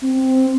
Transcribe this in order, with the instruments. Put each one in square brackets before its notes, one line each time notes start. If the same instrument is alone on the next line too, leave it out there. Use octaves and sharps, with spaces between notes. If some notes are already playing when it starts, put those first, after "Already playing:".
[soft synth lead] C4